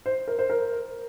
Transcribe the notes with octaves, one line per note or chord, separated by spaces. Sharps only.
C5
A#4
C5
A#4